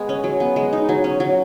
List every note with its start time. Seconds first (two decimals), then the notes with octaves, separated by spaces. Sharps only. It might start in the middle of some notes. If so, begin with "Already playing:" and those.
Already playing: G#3 B3
0.09 C#4
0.24 F#3
0.40 B3
0.56 G#3
0.73 D#4
0.89 F#3
1.04 C#4
1.20 F#3